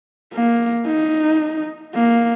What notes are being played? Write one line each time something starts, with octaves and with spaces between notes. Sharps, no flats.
A#3
D#4
A#3